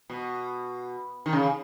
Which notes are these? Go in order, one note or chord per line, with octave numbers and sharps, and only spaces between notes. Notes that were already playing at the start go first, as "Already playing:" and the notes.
B2
D#3
C#3